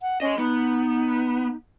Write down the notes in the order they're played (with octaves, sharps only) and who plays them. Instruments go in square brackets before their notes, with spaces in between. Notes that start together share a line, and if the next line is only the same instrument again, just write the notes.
[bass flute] F#5
[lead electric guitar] G#3 D#5 [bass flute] C#4
[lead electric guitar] B3 [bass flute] D#4